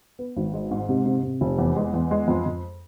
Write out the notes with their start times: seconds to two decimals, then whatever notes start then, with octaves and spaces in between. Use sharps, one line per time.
0.19 B3
0.37 G#1
0.53 G#3
0.71 G#2
0.89 C3
1.06 C3
1.23 C3
1.41 F1
1.58 E2
1.76 G#3
1.94 E2
2.11 G#3
2.28 F2
2.46 F2